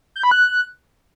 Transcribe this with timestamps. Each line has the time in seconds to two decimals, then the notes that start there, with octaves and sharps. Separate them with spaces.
0.16 G6
0.24 B5
0.31 F#6